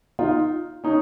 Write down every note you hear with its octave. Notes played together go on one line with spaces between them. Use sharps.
D#4 F4
C#4 D#4